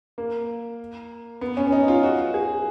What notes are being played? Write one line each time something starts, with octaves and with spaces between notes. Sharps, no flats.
A#3
B3
C#4
C#4
D#4
F4
F#4
G#4